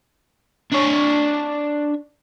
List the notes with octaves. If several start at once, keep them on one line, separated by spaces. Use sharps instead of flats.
D4 C#5